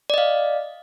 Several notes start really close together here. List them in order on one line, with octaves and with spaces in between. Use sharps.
D5 D#5 F5